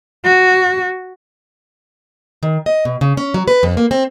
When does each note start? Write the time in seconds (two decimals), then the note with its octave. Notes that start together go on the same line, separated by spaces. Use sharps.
0.24 F#4
2.43 D#3
2.66 D#5
2.85 B2
3.01 C#3
3.17 C#4
3.34 F#3
3.48 B4
3.63 F2
3.77 A#3
3.91 C4